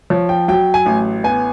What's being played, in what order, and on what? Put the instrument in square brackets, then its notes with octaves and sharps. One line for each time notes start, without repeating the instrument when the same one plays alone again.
[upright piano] F3 C#5
G5
F#3 G5
G#5
A1
B3 G#5